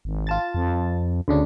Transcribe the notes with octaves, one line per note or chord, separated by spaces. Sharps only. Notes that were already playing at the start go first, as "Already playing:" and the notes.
G#1
F4 A5 A6
F2
D2 C#3 D4